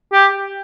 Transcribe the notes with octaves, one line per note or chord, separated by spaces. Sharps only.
G4